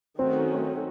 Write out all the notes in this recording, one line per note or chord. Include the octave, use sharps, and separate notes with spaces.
D#3 F#3 A3 C4 C#4 F#4